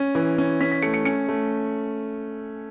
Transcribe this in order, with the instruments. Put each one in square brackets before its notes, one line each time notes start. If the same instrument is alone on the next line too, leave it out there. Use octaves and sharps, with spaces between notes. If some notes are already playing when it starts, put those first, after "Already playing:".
Already playing: [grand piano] C#4
E3
C#4
C#4 B6
B6
A3 C#7
C#7
C#4 C#7
A3